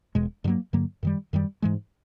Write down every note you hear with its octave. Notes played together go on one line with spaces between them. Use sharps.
E1 E2 B2 G#3
G2 D3 F#3 A#3
G2 D3 F#3 A#3
F#2 D#3 G3
F#2 D#3 G3
G#2 E3 G#3